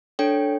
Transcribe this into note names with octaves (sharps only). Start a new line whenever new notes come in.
D4 A4 C#5 G5